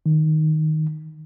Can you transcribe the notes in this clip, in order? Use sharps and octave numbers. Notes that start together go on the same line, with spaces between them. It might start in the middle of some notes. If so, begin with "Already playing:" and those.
D#3